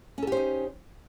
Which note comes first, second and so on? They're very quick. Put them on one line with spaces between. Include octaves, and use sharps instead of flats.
C#4 A4 G4 C5 D#4